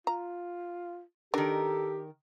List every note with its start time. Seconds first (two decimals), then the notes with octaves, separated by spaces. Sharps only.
0.07 F4 A#5
1.34 D#3 D4 G4 A4 A#4